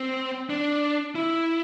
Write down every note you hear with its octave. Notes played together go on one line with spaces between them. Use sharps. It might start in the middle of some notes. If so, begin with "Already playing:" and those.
Already playing: C4
D4
E4